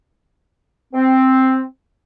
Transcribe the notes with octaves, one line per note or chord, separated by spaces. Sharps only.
C4